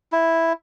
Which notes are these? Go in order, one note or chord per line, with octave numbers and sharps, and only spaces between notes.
E4